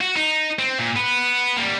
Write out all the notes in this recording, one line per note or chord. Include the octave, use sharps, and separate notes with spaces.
F#4
D#4
C4
A#2
B3 B4
G3 A#3